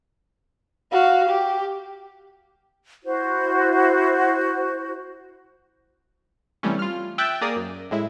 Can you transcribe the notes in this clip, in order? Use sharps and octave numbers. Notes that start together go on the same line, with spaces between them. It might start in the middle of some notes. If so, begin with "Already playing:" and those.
F#4 F5
G4
E4 F#4 C5
C3 E3 G3 A3 C#4
F4 F6
E5 G5 E6 F#6 A6
A#3 G#4 A#4 D5 D#6
F#2
A2 G#3 E4